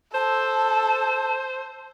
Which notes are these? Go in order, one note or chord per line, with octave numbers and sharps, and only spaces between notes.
A4 C5 A5